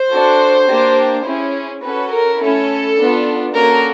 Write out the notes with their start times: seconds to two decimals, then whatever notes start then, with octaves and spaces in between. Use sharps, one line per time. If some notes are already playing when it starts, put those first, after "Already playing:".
Already playing: C5
0.09 D4 F#4 A4
0.67 A#3 D4 G4
1.25 C#4 E4 G#4
1.81 C#4 F#4 A4 B4
2.10 A#4
2.38 A3 C#4 E4 A4
2.97 B3 D4 F4
3.53 A#3 C#4 F#4 A4 A#4